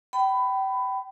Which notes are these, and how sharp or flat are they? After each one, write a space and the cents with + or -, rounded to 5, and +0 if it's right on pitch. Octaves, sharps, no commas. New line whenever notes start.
G5 -30 B5 +15